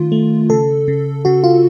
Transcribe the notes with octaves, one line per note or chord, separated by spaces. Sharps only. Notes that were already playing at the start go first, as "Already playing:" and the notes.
Already playing: D#3 A3 F4
A3
C#3 A4
C#3
C#3 F#4
F4